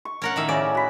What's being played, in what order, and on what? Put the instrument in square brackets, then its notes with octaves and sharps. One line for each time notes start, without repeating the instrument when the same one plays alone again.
[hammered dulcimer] C#6
[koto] C#4 A#4 F#5
A2 D#3 E5
[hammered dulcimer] C#3 C#4 A#5 [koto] D5
[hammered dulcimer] F#4 B5